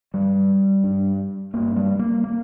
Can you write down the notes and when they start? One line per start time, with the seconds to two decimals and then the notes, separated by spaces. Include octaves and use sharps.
0.14 G2 G3
0.84 G2
1.54 G2 A#3
1.76 G3
1.99 A#3
2.24 A#3